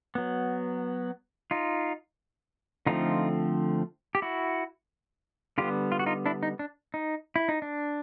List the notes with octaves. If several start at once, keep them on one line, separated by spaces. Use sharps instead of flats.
F#3 B3
D#4 F4
D3 F3 A3 C4 D#4 F4
G4
E4 F#4
D3 G3 B3 F4 G4
F4
F#4
D#4 F4
D4 E4
D#4
D4
D#4
E4
D#4
D4